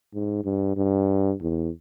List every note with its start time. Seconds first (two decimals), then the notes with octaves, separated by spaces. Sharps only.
0.14 G#2
0.44 G2
0.76 G2
1.41 E2